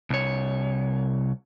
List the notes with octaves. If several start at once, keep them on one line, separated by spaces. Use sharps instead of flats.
C2 C#5